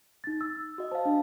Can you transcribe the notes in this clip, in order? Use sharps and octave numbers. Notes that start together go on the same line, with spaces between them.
D#4 A6
E6
F#4 D#5
C5 F5 A5
D4